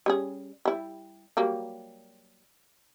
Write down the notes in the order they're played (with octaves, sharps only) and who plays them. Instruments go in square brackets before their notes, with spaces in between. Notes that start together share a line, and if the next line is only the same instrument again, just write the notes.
[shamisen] G3 C#4 G#4
G3 E4
F#3 G3 A#3